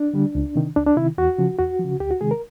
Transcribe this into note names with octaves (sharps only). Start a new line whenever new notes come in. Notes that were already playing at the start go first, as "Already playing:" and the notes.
Already playing: D4
D3 G3
C#2
C3 D#3
C#2 D4
D4
C3 D#3 E4
E2 F#4
C#3 F3
E2 F#4
F3
C#3
D2 G4
F#4
C3 D#3 G#3 G#4
A#4